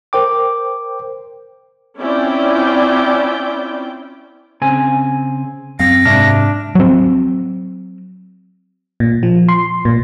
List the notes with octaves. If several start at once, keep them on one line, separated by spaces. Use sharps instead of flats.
A#4 C5 G5 D6
C4 C#4 E4 F4 D5 G5
C#3 C4 G#5
F#2 C4 F5 A#6
G#2 C3 D4 E5 F6
F#3 C4
A#2
F3
C6
A#2